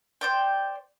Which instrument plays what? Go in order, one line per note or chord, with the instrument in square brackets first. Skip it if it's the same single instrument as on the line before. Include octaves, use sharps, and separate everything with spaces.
[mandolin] C5 D5 G5